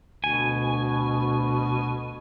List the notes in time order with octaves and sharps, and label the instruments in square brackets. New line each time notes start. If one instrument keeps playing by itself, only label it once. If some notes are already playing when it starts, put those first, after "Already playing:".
[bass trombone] D2 [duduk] B2 [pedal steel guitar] G#5